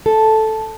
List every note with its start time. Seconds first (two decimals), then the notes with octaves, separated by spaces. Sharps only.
0.06 A4